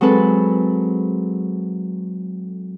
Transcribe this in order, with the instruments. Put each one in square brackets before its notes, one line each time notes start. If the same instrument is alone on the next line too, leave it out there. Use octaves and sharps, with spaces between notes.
[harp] F#3 G#3 C4 A4 B4